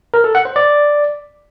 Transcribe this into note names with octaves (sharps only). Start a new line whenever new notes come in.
A#4
A4
F#5
C5
D5